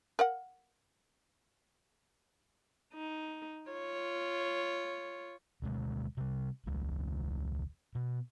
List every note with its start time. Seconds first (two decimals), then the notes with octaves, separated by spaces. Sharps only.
0.19 A#4 F5 F#5
2.94 D#4
3.71 F4 C#5
5.62 D2 B2 G#3
6.17 C3 G3
6.65 E1 C#2 E3 G#3
7.95 B2